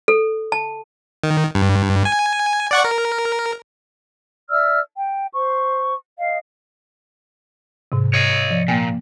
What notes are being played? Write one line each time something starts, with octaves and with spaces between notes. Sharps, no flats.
A4
A5
D#3
G2
G#5
D5 F#5 C#6
A#4
D5 E5 E6 F6
G5
C5 C#6
D#5 F5
G#2 C3
C#5 D#5
F3 D5
A#2 A#3 G5 G#5